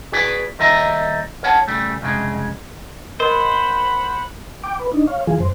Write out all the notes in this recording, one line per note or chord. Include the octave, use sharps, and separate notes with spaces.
F#4 G#4 B4 D5
D#2 G3 A#4 D#5 E5 A#5
A#4 C#5 F#5 G#5 A5
C#3 G3 A3
C2 F2 A2 C#3 G#3
A#4 C5 D#5 F#5 B5
G5 D6
B4
D4 D#4
C#5 F5
E3 F3 F4 G#4
F#2 C5